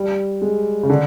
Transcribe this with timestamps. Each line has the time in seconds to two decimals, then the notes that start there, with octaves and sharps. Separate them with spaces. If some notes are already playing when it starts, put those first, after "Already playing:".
Already playing: G3
0.42 G#3
0.83 C#3
0.89 D3